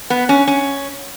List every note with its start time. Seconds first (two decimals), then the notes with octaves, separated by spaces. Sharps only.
0.10 B3
0.29 C#4
0.47 C#4